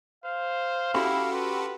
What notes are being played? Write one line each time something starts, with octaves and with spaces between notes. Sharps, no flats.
C5 F5
C#4 E4 F#4 G4 A4 G5 B5
F4 B4